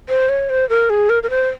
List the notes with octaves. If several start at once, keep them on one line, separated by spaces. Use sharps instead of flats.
C5
C#5
C5
A#4
G#4
A#4
A#4
C5